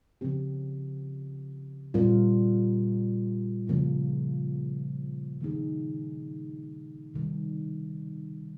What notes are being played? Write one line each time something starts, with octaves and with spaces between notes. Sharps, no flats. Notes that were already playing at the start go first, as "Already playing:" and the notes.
C#3 F3 C4 G4
A#2 G3 C4 F4 A#4
C#3 F3 A#3 F4
D#3 A#3 D#4 G#4
C3 D#3 G3